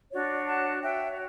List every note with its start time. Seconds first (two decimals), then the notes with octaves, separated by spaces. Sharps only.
0.11 D4 F#4 C#5 D5
0.47 F#5 A5
0.83 F#4 C#5 E5 G5